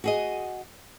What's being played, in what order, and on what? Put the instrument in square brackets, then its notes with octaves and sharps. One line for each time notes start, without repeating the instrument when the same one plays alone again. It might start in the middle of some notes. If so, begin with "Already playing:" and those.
[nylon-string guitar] F#4 G#4 D#5